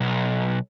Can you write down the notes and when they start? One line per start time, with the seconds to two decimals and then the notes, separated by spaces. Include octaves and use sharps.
0.01 B1